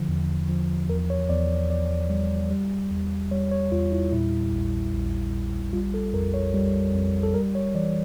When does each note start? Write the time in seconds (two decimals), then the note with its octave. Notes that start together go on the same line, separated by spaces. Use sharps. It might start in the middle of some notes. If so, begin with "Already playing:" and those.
Already playing: D3 F3
0.08 E2
0.49 F3
0.89 E2 A#4
1.10 C#5
1.29 E2 D5
1.70 E2 D5
2.10 G3
2.51 G3
2.91 E2
3.31 G3 C#5
3.51 C#5
3.72 E2 F4
3.92 E4
4.12 A#2 E4
4.52 A#1
4.93 A#1
5.33 A#1
5.73 G3 F4
5.94 A4
6.13 F2 A#4
6.34 C#5
6.54 G3
6.94 F2
7.23 A4
7.34 G3 A#4
7.55 C#5
7.75 E3 D5